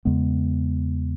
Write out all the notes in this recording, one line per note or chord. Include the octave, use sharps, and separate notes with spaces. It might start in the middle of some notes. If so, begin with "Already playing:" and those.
E2 C#3 G#3 B3